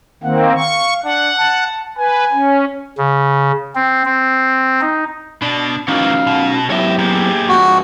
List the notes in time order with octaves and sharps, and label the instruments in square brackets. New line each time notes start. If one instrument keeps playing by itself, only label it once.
[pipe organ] D#3 A#3 C4 [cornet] F#5
[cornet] F5 [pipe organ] C#6
[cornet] D4 [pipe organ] F#5
[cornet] A5
[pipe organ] B4 [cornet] G#5
[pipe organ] C#4
C#3
C4
C4
D#4
[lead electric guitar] B2 [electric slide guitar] D4
[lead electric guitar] D#3 E3 [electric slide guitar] C#4 D#4 F#4 [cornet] F5
[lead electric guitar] B2
[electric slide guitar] F#3 B3 E4 [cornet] G4 [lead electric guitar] C#5 E5
[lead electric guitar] A#3 G#4
[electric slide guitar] G#2 F3 [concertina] F#4